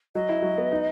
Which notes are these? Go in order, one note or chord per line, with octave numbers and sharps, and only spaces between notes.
F#3 D#5
E4
F#3
B3
D#4